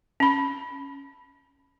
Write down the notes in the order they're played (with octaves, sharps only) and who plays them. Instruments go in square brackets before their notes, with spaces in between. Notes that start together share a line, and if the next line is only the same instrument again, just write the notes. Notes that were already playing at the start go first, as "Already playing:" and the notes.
[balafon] C#4 B5